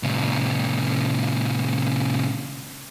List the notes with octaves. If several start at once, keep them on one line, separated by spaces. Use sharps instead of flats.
A#2 C#3